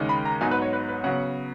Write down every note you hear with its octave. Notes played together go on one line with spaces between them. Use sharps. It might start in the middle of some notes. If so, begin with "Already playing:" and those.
Already playing: D#2 C#3 G#3 D#4
B5
A#5
G#2 F#3 B3 D#4 G#5
B4
C#5
B4
B4
C#3 F#3 B3 F#5